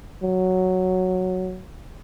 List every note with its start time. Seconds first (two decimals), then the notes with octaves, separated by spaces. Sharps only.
0.23 F#3